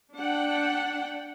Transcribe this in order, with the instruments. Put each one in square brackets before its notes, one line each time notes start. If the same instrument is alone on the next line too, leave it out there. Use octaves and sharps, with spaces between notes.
[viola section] D4 F#5 G5